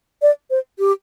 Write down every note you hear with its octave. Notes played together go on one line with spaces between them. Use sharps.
D5
C5
G4